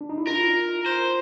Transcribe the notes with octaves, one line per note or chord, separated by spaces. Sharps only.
D4
D#4
E4
F4 A#4
C5